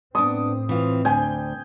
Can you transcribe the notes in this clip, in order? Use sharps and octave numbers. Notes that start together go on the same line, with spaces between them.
A2 B3 C4 D4 D#6
E3 F4
D2 G5 G#5